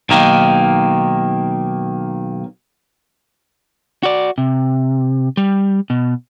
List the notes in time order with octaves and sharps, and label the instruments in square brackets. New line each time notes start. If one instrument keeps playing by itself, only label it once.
[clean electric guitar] B1 D#3 A#3
[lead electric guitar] F#4 D5
C3
G3
B2